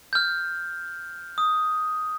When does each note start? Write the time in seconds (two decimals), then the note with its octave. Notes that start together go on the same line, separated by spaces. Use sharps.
0.13 F6 G6
1.38 D#6